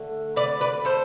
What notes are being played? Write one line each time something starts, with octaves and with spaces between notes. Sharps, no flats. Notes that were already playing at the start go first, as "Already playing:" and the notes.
Already playing: D3 A3
B4 D5
B4 D5
A4 C5